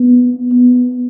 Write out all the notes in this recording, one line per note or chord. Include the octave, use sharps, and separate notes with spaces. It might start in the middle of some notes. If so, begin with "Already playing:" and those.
Already playing: B3
B3